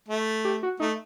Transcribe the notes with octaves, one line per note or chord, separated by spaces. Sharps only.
A3
G4
F#4
A3 D#4